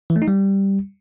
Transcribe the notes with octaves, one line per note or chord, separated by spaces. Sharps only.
E3
A3
D#4
G3